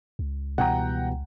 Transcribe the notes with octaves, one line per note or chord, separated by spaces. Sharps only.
C#2
B2 E3 G3 F#5 G5 A#5